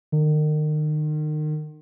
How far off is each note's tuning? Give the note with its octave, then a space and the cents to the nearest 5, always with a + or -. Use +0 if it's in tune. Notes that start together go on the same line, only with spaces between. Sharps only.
D#3 -35